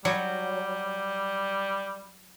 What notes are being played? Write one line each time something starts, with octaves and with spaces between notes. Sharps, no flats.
F#3 G3